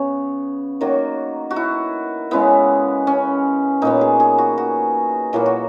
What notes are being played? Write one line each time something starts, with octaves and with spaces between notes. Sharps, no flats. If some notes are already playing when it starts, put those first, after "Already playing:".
Already playing: C#3 B3 C#5
D#3 F#3 A#3 F#4
F#4
E4
C#3 G#3 B3 E4
C#4
A#2 F#3 B3 D#4
G#4
G#4
F#4
F#4
A#2 F#3 A#3 E4
F#4